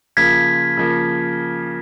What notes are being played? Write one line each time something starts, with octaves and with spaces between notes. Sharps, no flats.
C#3 F3 A#3 F4 G#6 B6
C#3 F3 A#3